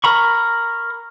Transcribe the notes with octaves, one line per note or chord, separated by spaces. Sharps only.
A#4 A#5 B5 C#6